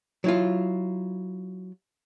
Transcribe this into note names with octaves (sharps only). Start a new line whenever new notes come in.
F#3 E4 F4